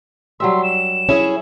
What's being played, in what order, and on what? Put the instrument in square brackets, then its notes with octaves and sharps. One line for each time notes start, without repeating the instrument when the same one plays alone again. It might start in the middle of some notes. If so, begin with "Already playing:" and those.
[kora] F#3 G3 E5 [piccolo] C6
[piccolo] E7
[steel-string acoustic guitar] C#4 E4 G#4